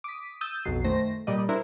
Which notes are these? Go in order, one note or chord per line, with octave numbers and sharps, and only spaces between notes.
D6 D#6 B6
D#6 E6 G6 A6
B1 F2 F#3 C7
F#2 D#3 A3 C5 A#6
A#2 G3 D5 D#5
D4 E4 A#4 C5